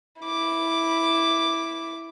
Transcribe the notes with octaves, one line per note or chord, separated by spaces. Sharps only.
E4 D6